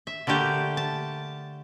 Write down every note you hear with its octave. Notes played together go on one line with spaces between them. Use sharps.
E5
D3 A3 A#3 G4
A5